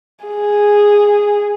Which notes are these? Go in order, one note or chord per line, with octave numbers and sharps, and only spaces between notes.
G#4